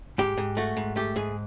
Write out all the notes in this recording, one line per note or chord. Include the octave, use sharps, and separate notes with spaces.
G#2 G4
G#2
A3 F#4
G#2
A3 G4
G#2 G#4